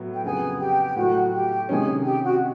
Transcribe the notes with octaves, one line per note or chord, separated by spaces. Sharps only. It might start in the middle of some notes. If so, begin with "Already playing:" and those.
Already playing: A2 F#3 B3
G5
F2 C#3 F#3 B3 G#4 G#5
G4 G5
G5
A2 F#3 A3 F#4 F#5
G4 G5
C3 D#3 G#3 C#4 G#4 G#5
G4 G5
F#4 F#5